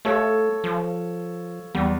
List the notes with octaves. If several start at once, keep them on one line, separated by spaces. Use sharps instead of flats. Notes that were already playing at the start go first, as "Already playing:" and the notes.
A3 A4 C#5 F5
F3
E2 G3